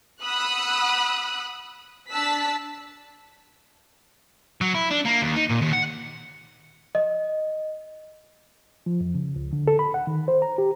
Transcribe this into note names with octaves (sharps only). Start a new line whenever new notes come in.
F#5 B5 D#6 E6 F#6
D4 A5 E6 F#6 B6
F#3
E4
D4
A#3
D#2
D#4
A#2
D#2
F#5
D#5
F3
F2
C#3
C#2
D3
A4
B5
F#5
D#3
C5
A#5
G4